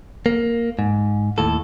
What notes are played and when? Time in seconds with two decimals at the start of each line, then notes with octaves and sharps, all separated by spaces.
0.26 A#3
0.79 G#2
1.38 D#2 A2 A4